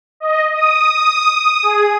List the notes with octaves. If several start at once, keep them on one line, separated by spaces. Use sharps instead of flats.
D#5
D#6
G#4